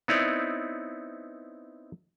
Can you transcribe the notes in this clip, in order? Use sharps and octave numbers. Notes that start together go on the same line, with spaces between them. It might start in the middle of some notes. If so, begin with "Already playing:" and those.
B3 C4 D#4 E4 C#5 D5